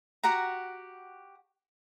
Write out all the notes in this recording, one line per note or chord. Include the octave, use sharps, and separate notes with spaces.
F#4 G4 F#5 A#5